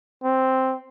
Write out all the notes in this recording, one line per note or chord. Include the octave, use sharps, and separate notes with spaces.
C4